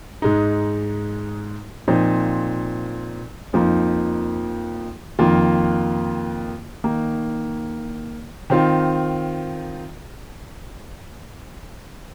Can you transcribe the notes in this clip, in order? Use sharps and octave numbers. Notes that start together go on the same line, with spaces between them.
G#2 G#3 D#4
A#2 F3 C4 D#4
F2 F3 A#3 D#4
F2 D#3 A#3 F4
D#3 A#3 D#4
D#3 C4 F4